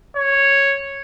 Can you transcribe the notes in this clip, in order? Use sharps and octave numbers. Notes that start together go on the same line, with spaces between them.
C#5